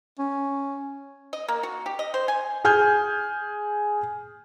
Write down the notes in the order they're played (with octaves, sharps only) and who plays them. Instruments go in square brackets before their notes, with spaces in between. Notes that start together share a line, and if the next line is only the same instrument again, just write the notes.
[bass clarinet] C#4
[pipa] D#5
A#3
F#4
G4
D#5
C5
G#5
[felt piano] G#4 G#5 F6 G6